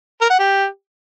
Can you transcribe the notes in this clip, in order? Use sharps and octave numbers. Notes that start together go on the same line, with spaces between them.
A#4
F#5
G4